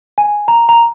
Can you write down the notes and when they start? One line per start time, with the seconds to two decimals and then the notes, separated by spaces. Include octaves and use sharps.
0.18 G#5
0.48 A#5
0.69 A#5